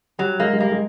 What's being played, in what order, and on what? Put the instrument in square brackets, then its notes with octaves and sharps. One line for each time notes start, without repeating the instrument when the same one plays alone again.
[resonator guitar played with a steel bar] F#3 [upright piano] G3
[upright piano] G#3 [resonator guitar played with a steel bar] A#3
[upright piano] G#3
[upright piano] G3 [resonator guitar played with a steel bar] A#3
[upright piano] G#3